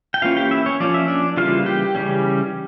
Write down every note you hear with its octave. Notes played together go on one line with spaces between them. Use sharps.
G5
E3 A#3 C#4 F4 F5
G4 G5
E4 E5
C#4 C#5
F3 A#3 C#4 D5
E5
D4 D5
C#3 E3 G3 A#3 F4 F5
G4 G5
C#3 E3 G3 C#4